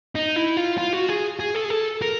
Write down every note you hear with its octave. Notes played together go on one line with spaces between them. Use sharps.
D#4
E4
F4
F4
F#4
G#4
G#4
A4
G#4
A4
A#4